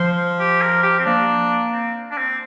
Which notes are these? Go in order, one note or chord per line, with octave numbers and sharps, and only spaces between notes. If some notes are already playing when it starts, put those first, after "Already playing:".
Already playing: F3 C5
G4
A#4
G4
C4
A#3 D4
C4
D4
C4